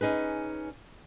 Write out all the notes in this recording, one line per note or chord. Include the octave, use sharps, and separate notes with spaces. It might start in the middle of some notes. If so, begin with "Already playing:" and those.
C#4 D#4 G#4 B4